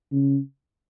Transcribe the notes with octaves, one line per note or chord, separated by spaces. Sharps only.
C#3